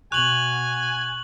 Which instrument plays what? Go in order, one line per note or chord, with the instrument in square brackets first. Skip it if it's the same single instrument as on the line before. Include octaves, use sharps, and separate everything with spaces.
[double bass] B2 [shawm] G#5 [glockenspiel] C#6 F7 [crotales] F#6 F#7